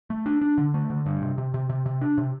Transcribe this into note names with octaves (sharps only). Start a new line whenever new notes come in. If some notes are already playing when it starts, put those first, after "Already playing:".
A3
D4
D4
D3
A3
D3
G2
C3
C3
C3
C3
C3
D4
C3